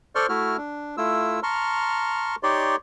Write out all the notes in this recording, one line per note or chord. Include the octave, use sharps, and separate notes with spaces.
A4 C5 D5 C6 C#6 F6
A3 E4 F#4 F6
D4
A3 E4 F4 E6
A5 A#5 C6 C#6 F6
D#4 G4 C#5 D5 C6